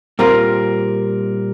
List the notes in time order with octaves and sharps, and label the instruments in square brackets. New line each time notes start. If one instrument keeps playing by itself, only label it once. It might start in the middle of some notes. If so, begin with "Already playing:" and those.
[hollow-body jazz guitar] A#2 G3 C4 F4 [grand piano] A#4